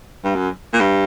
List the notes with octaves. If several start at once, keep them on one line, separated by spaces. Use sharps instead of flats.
G2
F#2
A#2
G2